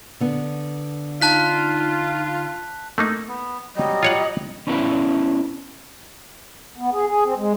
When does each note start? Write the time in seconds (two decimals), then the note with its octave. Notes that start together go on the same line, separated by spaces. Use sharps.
0.20 D3 B3
1.22 D#4 F4 A5 F#6 B6
2.98 A3 A#3 D#4
3.29 B3
3.76 F#3 G3 D#5
4.03 F4 C#5 F#5
4.67 B3 C#4 D4 E4 B4
6.78 B3
6.92 G#4
7.07 G#4
7.25 C4
7.37 G#3